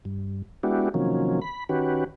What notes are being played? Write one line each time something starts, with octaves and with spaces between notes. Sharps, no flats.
G2
G#3 B3 D4 E4 F#4 G4
C3 D#3 F3 F#3 A#3 C#4
B5
D#3 C#4 F#4 G4 B4